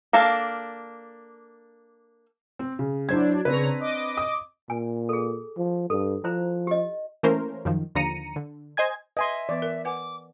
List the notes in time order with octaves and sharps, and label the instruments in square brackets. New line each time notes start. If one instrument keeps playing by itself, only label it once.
[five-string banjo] A#3 D4 A4 F5
[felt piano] C4
C#3
[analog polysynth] F#3 D4 [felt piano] E4 C5 G#6
[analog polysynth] C#3 C#5 A#5 [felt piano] C4 D4 B4
[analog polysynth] D#5 D6
[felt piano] D#6
[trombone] A#2 [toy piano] G#5
[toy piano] G#4 A4
[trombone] F3
[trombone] G2 [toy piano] A4
[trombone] F3 [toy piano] E4 C5 A#5
[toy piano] G4 D#5
[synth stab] E3 A3 A#3 C#4 A#4 C5
F#2 D#3 F3
D#2 D3 F3 A#5 C#7 D#7
D3
C5 D#5 G#5 G#6
[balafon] B4 [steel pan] D#5 G#5 C6 [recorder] E5
[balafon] E3 B3 B4 [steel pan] D5
[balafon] A#4
[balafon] B4 F#5 G#5 [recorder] D6